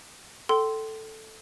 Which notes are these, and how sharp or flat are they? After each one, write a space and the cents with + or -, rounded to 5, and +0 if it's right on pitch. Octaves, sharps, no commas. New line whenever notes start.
A4 +0 G5 -30 C6 -5